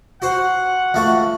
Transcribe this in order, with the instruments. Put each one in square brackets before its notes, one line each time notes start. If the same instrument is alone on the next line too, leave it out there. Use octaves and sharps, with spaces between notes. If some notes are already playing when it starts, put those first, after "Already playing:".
[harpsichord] F#4 C5 [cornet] F#5
[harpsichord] C#2 A3 F#4